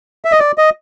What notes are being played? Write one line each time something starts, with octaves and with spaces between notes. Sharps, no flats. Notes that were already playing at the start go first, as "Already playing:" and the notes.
E5
D#5
D5
D#5